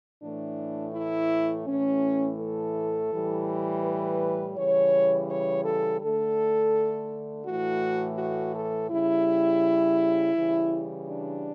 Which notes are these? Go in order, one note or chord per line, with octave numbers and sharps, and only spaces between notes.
A2 E3 A3 D4
E4
A2 E3 A3 C#4
A4
A2 E3 G3
B4
C#3 E3 G3 C#5
C#5
A4
D3 A3 A4
A2 E3 A3 F#4
F#4
A4
C#3 G3 E4
C#3 E3 G3
D4